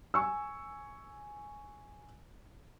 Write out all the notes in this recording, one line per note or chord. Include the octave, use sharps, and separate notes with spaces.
G#5 C#6 E6